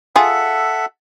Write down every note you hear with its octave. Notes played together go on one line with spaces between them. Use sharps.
F4 G#4 A4 E5 F#5